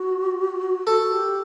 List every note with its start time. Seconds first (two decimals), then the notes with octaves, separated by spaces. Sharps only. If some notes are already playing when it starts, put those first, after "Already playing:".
Already playing: F#4
0.87 F#4 A4
1.11 G4